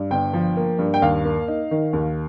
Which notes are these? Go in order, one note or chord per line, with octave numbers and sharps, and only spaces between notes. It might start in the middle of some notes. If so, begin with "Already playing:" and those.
Already playing: G2
G1 G5
F3
A#3
G2
G5
D#2 F5
A#3
D#4
D#3
D#2